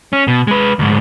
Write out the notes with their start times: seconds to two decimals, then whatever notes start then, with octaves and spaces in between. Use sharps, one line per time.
0.13 C#4
0.27 B2
0.47 G#3 B4
0.79 D2 G#2